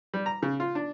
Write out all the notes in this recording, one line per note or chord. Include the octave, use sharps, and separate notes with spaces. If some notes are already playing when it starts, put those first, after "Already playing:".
G3
A#5
C#3
F4
D4